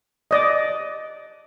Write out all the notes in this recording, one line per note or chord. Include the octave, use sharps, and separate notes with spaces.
D5 D#5